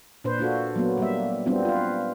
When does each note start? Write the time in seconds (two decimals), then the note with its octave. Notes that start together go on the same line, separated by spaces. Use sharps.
0.24 A#2 D4 B4 C5
0.39 D4 F4 F#4 A4
0.76 F#3 A#3 B3
0.98 G3 A#3 E5
1.46 G3 B3 C4 D4 F4
1.65 F4 B4